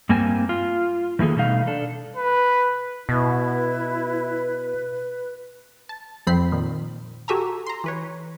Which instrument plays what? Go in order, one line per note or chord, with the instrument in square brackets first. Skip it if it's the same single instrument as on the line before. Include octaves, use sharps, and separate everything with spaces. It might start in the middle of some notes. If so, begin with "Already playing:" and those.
[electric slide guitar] G2 G3 A#3 C4 G#5
F4
D#3 E3 A#3 G#4 A4
B2 G3 A3 D#4 F5
D4 A4
[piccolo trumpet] B4
[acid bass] B2 [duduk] E4 [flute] B4
[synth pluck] A5
F2 F3 C4 B5 C7
A#2 D#3
F#4 G4 A4 E5 G#5 A#5
A#5 C6
E3 B4 C#5